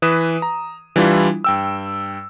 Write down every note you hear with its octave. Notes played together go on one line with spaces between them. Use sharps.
E3 B4 D#6 E7
A#5
E3 G3 D4 E4 F4
G2 G5 E6